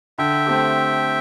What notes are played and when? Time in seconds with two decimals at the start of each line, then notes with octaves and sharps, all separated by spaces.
0.19 D3 E5 G5
0.47 A3 C4 G4